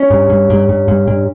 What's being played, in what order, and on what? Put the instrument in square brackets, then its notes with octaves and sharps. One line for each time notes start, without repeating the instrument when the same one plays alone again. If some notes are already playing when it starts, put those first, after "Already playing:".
Already playing: [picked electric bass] C#4
G2
G2
G2
G2
G2
G2